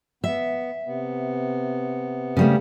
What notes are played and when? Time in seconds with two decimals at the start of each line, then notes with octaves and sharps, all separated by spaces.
0.24 B3 E5
0.86 C3 B3
2.37 C#3 G3 A3